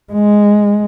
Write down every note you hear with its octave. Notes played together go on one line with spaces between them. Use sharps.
G#3